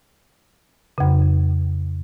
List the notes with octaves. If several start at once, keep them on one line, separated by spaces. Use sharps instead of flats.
F2 C#3